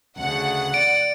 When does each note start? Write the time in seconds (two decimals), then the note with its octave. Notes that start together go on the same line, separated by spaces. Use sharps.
0.18 D2 C#3 F#5
0.74 D5 D7